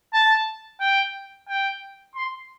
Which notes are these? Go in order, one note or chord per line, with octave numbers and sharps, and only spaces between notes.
A5
G5
G5
C6